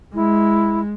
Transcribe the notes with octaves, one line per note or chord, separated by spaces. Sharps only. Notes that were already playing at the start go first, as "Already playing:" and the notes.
G#3 E4